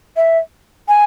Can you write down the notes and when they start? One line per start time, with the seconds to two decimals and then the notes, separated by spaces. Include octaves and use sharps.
0.16 E5
0.88 G#5